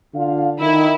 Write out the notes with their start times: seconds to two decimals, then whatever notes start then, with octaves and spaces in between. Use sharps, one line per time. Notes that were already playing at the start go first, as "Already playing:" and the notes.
0.14 D3 F4 F5
0.60 D#3 E4